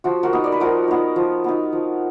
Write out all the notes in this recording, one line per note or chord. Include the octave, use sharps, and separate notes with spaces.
F3 F#4
F#4 A#4
B3 D#4
D5
B4
F3 F#4 A#4
B3 D#4
F3
B3 D#4
F3